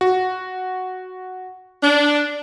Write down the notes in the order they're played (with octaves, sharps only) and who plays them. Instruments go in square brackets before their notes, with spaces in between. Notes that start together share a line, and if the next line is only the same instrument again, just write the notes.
[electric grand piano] F#4
[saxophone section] D4